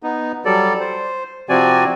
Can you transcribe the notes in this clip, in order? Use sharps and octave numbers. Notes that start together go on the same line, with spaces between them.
B3 D#4
F#3 G3 A4 D5
C5
C3 F3 C4 F#4 D5 G#5